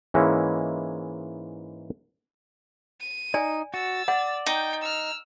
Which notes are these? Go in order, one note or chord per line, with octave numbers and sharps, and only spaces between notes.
G#2 E3 G#3 A#3 C#4 E4
D#7
D#4 D5 G#5
F#4 E6 A6
D5 F#5
D#4 G5
E6 F6